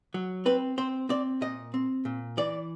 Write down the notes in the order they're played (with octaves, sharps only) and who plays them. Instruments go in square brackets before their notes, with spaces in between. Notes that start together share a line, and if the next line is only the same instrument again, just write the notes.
[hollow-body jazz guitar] F#3
C4 B4
C4 C5
C4 D5
A#2 D#5
C4
A#2
E3 D5